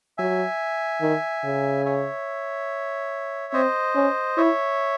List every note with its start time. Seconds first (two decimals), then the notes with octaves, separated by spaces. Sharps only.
0.18 F#3 E5 G#5
1.02 D#3
1.45 C#3
1.86 C#5 E5
3.53 C4 C5 D#5
3.95 C#4
4.37 E4 C#5 E5